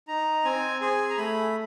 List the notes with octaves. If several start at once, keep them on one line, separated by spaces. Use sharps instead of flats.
D#4 A#5
C4 G#5
G#4 G#5
A#5
A3 B5